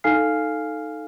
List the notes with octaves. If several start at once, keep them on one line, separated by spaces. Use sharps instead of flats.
D#4 A4 F5 G#5 F6 C7